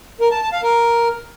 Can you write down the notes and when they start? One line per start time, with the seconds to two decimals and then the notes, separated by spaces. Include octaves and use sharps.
0.21 A#4
0.31 A5
0.42 A5
0.53 F5
0.63 A#4